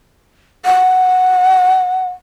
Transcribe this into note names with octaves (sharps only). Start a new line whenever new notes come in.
F#5